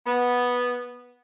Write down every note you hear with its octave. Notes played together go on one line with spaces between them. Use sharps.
B3